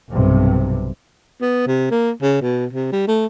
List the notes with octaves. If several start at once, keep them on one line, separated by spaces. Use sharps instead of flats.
B1 G2 C3
B3
C3
A#3
C#3
B2
C3
G3
A3